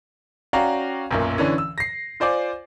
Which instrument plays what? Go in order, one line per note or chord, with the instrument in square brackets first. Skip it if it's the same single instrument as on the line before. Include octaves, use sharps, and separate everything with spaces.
[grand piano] C#4 F#4 D5 F5 G5 A#5
B1 F#2 A#2
D3 E3 C#4
E6
A#6 C7
F4 C5 D5 G#5 D6